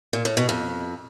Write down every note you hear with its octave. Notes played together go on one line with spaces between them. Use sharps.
A#2
A2
B2
F2